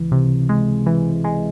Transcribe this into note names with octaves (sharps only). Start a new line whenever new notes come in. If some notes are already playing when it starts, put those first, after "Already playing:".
Already playing: C#2 E3
C3
G#3
E3
G#3